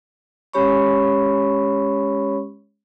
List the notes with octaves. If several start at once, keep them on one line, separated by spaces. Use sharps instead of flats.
G#3 C#4 G4 C#5 B5 C#6